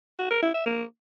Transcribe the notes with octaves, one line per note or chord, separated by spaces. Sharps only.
F#4
A#4
E4
E5
A#3